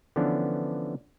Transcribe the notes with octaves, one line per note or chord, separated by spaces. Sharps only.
D3 E3 F3 B3 C#4 D4